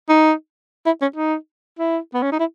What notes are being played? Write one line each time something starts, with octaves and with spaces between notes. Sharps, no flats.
D#4
E4
C#4
D#4
E4
B3
C#4
D#4
E4